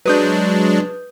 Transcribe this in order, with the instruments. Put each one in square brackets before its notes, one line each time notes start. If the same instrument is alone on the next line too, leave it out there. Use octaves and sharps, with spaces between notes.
[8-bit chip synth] F#3 G#3 D4 [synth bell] B4 D#6 G6